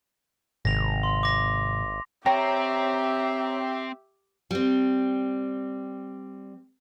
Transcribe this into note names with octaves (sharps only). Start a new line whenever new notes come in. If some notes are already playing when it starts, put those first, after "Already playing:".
G#1 G#2 C3 D#3 A#6 F7
C6
D6 A#6
C4 G4 C#5 E5 G5 A#5
G3 C4